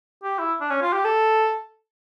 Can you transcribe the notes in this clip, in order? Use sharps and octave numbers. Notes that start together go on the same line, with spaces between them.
G4
E4
D4
C#4
F4
G4
A4